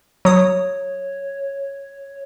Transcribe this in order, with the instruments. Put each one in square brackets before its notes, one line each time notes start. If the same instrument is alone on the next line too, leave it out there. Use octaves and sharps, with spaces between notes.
[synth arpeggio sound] F#3 D#6 [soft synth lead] C#5